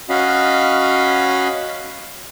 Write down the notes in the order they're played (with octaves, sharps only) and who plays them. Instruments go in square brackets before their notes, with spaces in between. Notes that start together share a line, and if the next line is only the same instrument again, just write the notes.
[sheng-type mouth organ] C#4 F#4 D#5 F5 B5